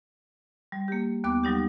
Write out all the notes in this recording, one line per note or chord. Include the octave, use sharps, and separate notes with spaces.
G3
A#3 G4
D#2 B3 D6 F#6
F#3 G3 D#4 G4